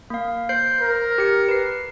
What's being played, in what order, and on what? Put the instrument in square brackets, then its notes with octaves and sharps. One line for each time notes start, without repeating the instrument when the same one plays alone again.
[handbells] A#3 F5
C5 G6 C7
[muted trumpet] A#4
[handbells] G4 C#7
B4 C7